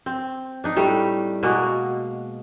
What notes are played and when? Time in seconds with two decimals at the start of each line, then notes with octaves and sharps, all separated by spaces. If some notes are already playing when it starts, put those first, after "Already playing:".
0.06 C4
0.64 D4 D#4
0.76 A2 G3 A3
1.43 B2 G#3 A#3 F#4